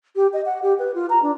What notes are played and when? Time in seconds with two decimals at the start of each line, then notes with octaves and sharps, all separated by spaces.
0.16 G4
0.33 D#5
0.46 F#5
0.63 G4
0.79 B4
0.94 F4
1.10 A#5
1.23 D4